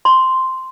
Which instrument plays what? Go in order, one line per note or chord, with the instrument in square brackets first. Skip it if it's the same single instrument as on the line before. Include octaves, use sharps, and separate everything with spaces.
[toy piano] C6